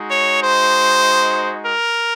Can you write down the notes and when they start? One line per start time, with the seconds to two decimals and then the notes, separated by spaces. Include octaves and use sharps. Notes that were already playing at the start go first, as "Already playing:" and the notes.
Already playing: G#3 D#4 F#4
0.09 C#5
0.40 C5
1.64 A#4